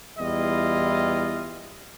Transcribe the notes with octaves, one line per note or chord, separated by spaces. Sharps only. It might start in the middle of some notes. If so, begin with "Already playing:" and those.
E2 G3 E4 F4 D#5